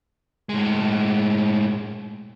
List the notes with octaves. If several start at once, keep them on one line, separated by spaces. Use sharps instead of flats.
A2 G#3